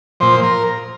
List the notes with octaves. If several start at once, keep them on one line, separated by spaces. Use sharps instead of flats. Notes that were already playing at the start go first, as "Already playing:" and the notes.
A#2 F3 C5
A#4